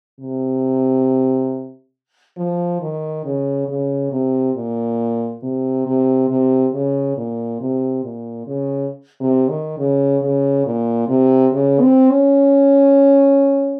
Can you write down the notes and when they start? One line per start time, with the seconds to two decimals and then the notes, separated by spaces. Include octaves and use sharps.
0.20 C3
2.37 F3
2.81 D#3
3.25 C#3
3.68 C#3
4.12 C3
4.56 A#2
5.43 C3
5.86 C3
6.29 C3
6.73 C#3
7.17 A#2
7.60 C3
8.04 A#2
8.47 C#3
9.21 C3
9.49 D#3
9.78 C#3
10.22 C#3
10.65 A#2
11.08 C3
11.53 C#3
11.82 C4
12.10 C#4